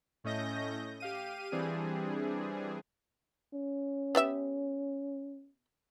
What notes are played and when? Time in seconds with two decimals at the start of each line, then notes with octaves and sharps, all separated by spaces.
0.24 A2 A3 C#4 D#5 G6 A#6
1.00 G4 F5 D#7
1.52 E3 G3 C4 D4 G#4
3.53 C#4
4.15 B3 G4 E5